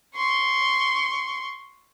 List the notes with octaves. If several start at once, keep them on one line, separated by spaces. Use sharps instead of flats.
C6 C#6